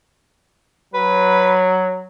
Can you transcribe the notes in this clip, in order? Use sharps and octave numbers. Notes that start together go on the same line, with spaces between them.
F#3 B4